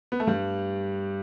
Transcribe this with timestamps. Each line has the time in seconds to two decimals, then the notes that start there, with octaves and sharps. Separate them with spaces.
0.12 B3
0.20 A3
0.27 G2 G3